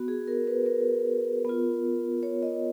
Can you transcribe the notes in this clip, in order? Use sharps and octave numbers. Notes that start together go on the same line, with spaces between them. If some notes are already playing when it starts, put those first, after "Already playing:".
Already playing: B3 F#4
G#4
A#4
B4
A#4
B3 F4
C#5
D#5